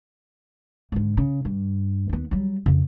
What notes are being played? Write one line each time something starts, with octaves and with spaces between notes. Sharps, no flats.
G#2 D3
C#3
G2
D#2 B3
F#3 G3
F2 C#3